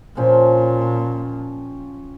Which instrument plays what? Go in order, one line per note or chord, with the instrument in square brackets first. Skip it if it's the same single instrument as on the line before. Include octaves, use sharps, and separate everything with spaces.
[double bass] A#2 [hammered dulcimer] F3 C#4 G5